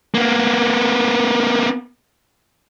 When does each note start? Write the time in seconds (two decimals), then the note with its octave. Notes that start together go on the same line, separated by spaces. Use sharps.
0.15 A#3 B3